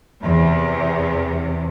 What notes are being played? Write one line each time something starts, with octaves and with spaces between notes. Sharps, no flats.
E2 C3